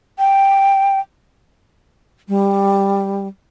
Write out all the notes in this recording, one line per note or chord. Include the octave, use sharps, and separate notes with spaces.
G5
G3